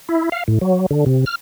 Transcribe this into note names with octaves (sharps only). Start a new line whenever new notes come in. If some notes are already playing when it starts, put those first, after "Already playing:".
E4
F5
A2
F#3
D3
C3
F6